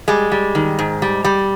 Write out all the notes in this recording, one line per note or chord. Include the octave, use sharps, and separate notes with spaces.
G3 G#3
G3
D#3
G#2
G3
G3